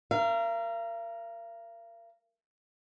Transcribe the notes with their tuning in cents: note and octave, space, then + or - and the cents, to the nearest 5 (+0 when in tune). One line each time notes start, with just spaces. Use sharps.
A#4 +0 F5 -40